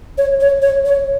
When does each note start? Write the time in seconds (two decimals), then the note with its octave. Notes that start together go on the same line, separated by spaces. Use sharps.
0.18 C#5
0.41 C#5
0.62 C#5
0.85 C#5